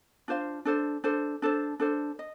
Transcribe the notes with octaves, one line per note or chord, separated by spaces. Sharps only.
D4 F4 C5 F5
D4 A4 C5
D4 A4 C5
D4 A4 C5
D4 A4 C5
D#5